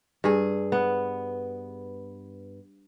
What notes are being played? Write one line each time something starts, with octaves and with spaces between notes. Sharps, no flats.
G2 G#4
B3